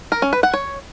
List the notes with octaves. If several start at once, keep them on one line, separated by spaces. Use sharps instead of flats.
A#4
C#4
B4
F#5
C#5